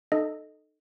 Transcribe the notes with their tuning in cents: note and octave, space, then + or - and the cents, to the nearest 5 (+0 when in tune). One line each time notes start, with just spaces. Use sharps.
D#4 -25 A4 +0 D#5 +0